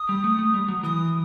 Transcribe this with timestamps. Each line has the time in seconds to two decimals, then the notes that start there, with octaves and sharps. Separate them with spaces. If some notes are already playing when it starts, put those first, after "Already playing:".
Already playing: D#6
0.09 G3
0.24 A3
0.39 A3
0.54 G3
0.68 F#3
0.83 E3 D#6